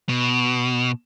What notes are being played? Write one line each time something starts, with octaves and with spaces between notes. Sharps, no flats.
B2